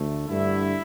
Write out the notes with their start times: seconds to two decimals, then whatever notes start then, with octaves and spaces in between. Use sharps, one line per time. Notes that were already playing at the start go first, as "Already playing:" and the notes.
Already playing: D2 A3
0.29 G2 D3 A3 E4